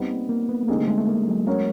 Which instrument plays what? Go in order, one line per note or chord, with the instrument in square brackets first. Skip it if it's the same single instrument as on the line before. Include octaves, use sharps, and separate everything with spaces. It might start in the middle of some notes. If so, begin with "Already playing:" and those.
Already playing: [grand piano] G3 B3 D#4 [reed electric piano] C4
[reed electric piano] A#3
A#3
B3
A3
[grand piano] D3 G3 C4 D#4 G#4 [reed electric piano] A#3
[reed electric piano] A3
G#3
A3
A#3
F#3
[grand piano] A#3 C#4 F#4 A#4 C#5